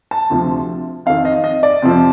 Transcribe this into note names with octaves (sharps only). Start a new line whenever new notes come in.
A5
D2 C3 F3
F2 D#3 F5
D#5
D#5
D5
F2 C3 F3